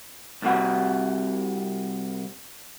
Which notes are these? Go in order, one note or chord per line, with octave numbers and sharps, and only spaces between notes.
C2 C3 F#4